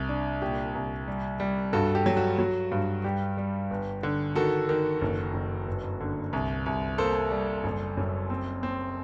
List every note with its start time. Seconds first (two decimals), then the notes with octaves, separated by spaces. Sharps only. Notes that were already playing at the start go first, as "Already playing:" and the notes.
Already playing: C2
0.09 D4
0.42 A#2 G4
0.75 C2
1.07 G3
1.40 G3
1.73 G2 F#4 A4
1.95 G4
2.06 F#3
2.17 F#4
2.39 F#3
2.72 G2
3.04 G3 G4
3.37 G3
3.71 G1
4.03 D3
4.35 D#3 F#4 A4
4.69 D#3
5.01 F#1
5.34 F#1
5.67 G1
6.00 D3
6.33 C2
6.66 C2
6.98 A#3 A4 C5
7.31 G3
7.64 F#1
7.97 F#2
8.30 C4
8.63 C4